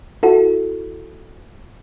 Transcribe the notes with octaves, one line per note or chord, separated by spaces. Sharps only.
E4 F#4 A4